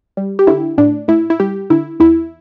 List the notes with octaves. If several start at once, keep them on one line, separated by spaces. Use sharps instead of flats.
G3
G4
D3 E4
A2 D4
A2 E4
E4
G3 G4
D3 E4
E2 E4